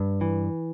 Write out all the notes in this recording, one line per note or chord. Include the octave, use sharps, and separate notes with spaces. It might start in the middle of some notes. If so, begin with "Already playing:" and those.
Already playing: G2
E3